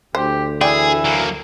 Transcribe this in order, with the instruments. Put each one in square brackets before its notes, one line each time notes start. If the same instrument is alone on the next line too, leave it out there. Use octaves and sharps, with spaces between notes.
[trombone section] D2 [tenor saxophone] G4 [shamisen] C5
[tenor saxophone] E3 [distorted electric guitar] G#4 [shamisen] D5 G5
[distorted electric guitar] F#3 A#3